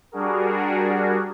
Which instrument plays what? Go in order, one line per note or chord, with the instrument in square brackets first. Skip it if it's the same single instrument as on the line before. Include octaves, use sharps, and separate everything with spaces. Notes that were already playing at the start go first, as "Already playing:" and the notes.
[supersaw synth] G3 D4 F#4 G#4 A#4